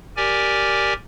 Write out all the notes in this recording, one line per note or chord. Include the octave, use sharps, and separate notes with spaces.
G4 A#4 D5 G#5